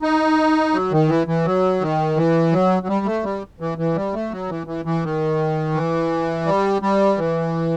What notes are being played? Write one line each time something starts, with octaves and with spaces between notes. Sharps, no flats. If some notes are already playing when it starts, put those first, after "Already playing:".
D#4
F#3
D#3
E3
E3
F#3
D#3
E3
F#3
F#3
G3
A3
G3
E3
E3
G3
A3
F#3
E3
E3
E3
D#3
E3
G3
G3
E3